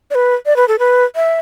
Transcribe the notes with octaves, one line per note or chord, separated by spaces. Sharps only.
D5
B4
D5
B4
A4
B4
E5